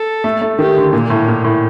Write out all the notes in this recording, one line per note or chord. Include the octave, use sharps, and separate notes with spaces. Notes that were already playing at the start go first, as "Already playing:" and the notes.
Already playing: A4
A3
A3
D#3 G4
D3
A#2 A#3
A2
A#2
A2